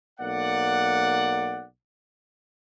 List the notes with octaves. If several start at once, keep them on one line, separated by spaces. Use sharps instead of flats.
B1 A#3 D5 F#5